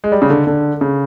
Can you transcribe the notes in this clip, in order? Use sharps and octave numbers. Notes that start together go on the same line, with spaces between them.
G#3
G3
C#3
D3
D3
C#3